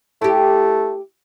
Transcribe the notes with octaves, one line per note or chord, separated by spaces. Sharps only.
A3 E4 G4